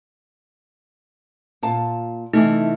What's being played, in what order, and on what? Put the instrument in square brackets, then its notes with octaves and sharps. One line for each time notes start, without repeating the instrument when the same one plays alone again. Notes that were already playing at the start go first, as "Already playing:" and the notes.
[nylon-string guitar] A#2 F4 A5
[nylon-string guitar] C3 E3 A3 [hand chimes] D#4